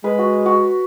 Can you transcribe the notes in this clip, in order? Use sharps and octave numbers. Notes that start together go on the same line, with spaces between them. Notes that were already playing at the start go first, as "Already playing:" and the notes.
G#3 B4
F#4
F#4